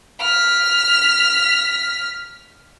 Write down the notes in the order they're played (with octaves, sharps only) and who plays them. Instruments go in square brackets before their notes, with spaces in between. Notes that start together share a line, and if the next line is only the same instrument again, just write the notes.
[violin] F6 B6